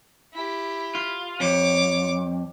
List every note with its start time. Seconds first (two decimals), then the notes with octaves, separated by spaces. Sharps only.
0.33 E4 G4
0.95 F4
1.40 F2 C#5 D6